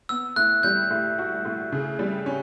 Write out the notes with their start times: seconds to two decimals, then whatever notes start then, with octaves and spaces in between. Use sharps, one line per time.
0.09 B3 E6
0.36 A2 F#6
0.63 G3 G6
0.91 A2
1.18 F#4
1.45 A2
1.72 C#3
1.99 G3
2.26 C#4